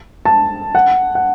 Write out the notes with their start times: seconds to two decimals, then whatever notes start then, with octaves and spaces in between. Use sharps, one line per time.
0.25 A5
0.75 F#5
1.15 F#5